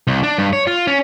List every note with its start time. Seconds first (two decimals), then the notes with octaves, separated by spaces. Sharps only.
0.07 C2
0.23 D4
0.38 G2
0.53 C#5
0.67 F4
0.87 C#4